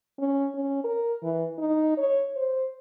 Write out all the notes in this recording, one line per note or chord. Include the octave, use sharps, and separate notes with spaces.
C#4
C#4
A#4
E3
D#4
C#5
C5